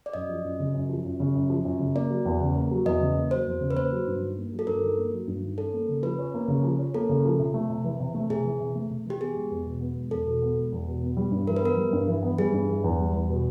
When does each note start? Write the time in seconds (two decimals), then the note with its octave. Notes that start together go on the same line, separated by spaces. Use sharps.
0.06 D5
0.13 F#2 D#5
0.29 F3
0.45 F#2
0.60 C#3
0.74 F#2
0.89 F3
1.04 F#2
1.20 C#3
1.35 F#2
1.50 F3
1.65 F#2
1.80 C#3
1.95 A#3 D5
2.10 F#3
2.26 E2
2.41 C#3
2.56 A#3
2.71 F#3
2.85 E2 D#5
3.00 C#3
3.16 A#3
3.31 F#3 C5
3.47 E2
3.61 C#3
3.71 B4
3.76 A#3 C5
3.92 F#3
4.07 G2
4.22 D#3
4.38 A#3
4.52 F#3
4.59 A4
4.67 G2 A#4
4.83 D#3
4.98 A#3
5.12 F#3
5.27 G2
5.43 D#3
5.58 C#4 A4
5.73 A#3
5.88 C#3
6.03 F3 B4
6.19 C#4
6.34 A#3
6.48 C#3
6.64 F3
6.79 C#4
6.94 A#3 A4
7.09 C#3
7.25 F3
7.39 C3
7.54 A3
7.69 C3
7.84 E3
8.00 C3
8.14 A3
8.30 C3 G#4
8.45 E3
8.60 C3
8.75 A3
8.90 C3
9.05 E3 G4
9.20 B3 G#4
9.36 G#3
9.51 E2
9.66 B2
9.81 B3
9.97 G#3
10.11 E2 A4
10.26 B2
10.42 B3
10.57 G#3
10.72 E2
10.87 B2
11.03 B3
11.17 G3
11.32 G2
11.47 E3 A#4
11.56 B4
11.62 B3 A#4
11.77 G3
11.93 G2
12.08 E3
12.23 B3
12.38 G3 G#4
12.53 G2
12.68 E3
12.84 E2
12.99 G3
13.13 E2
13.29 B2